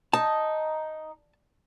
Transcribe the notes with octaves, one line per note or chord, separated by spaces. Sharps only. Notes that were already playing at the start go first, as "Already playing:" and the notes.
D#4 A5